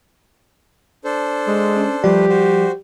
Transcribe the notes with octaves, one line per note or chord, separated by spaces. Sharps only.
D4 A4 C5
G#3
C#4
F3 G3 A3 G4 B4 C5 D5
F#4 C5